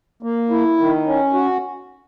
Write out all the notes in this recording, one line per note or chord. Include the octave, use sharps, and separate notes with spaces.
A#3
E4
D#3
C#4
F#4